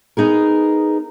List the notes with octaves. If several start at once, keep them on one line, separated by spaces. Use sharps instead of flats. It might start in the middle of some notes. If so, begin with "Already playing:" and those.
B3 D#4 G#4 A#4